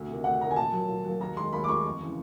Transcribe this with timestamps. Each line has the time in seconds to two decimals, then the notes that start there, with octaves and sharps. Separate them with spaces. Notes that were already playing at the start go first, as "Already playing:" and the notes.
Already playing: D2
0.08 C3 D#3
0.24 D2 F#5
0.41 C3 D#3 A#5
0.51 G#5
0.56 A#2 A5
0.72 F#3 A#3
0.88 A#2
1.04 F#3 A#3
1.21 D#2 A#5
1.37 D#3 G#3 C6
1.53 D#2 B5
1.64 D6
1.68 D#3 G#3 C#6
1.85 F2
2.01 C#3 E3